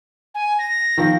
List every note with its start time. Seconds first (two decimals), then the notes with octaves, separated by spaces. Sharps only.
0.35 G#5
0.59 A#6
0.98 D#3 F3